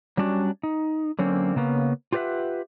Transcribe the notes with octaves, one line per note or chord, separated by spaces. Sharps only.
F#3 G3 C#4 D4 E4 F#4
D#4
D3 F#3 A#3 C4 C#4
C#3 A#3 B3 C#4
F4 G4 B4 D5 E5 F#5